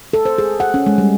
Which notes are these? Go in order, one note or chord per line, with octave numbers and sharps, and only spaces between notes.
A4
C5
G#4
F#5
C#4
G#3
G3